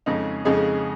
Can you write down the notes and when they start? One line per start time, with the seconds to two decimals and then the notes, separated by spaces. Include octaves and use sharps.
0.06 F2 C#3 G#3 D#4 G#4
0.45 F2 C#3 G#3 D#4 G#4